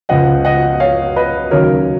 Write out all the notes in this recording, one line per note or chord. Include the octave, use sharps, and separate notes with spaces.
C#2 C#3 F3 D#5 F#5
D#5 F#5
C#5 F5
B4 D#5
D#2 C#3 F#3 A#4 C#5